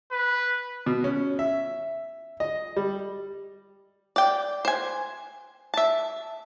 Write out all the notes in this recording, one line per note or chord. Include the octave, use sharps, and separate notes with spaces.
B4
B2
C#4
E5
D#5
G3
D5 G5
C5 G#5
E5 A5